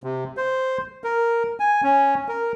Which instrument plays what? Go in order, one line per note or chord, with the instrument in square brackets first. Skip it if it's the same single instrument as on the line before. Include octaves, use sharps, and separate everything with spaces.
[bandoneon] C3
C5
A#4
G#5
C#4
A#4